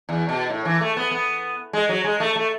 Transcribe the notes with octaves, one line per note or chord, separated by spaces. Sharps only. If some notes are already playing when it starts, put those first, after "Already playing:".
E2
B2
A2
E3
A3
B3
B3
G#3
F#3
G#3
A3
A3